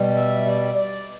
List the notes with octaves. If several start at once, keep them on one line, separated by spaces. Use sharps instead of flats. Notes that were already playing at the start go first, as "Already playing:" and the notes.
Already playing: B2 G3
E5
D5
D5